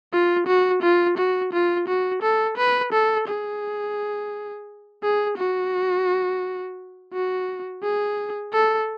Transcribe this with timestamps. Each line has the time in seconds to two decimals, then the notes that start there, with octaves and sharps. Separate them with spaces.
0.12 F4
0.47 F#4
0.82 F4
1.17 F#4
1.53 F4
1.88 F#4
2.22 A4
2.57 B4
2.92 A4
3.28 G#4
5.03 G#4
5.37 F#4
7.13 F#4
7.83 G#4
8.53 A4